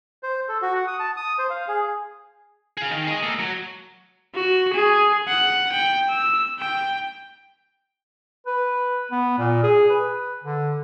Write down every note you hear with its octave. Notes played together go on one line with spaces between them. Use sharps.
C5
A4
F#4
F#5
D#6
A5
D#6
C5
F5
G#4
G#4 F5
D#3
G#4 D#5
A#3 A4
F#3
F#4
G#4
F#5
G5
E6
G5
B4
B3
A#2
G#4
B4
D3